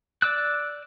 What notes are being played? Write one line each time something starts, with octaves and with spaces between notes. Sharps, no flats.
D5 D6 E6 F#6